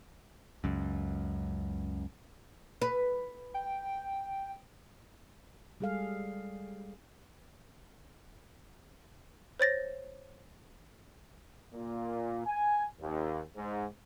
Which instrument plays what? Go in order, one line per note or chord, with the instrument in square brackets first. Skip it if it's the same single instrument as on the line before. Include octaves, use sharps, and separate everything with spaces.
[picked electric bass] C#2 F#2
[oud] B4
[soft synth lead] G5
[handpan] G3 G#3 G#4 A4 F5
[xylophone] C5 C#5 A6 A#6
[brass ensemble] A#2
G#5
D#2
G#2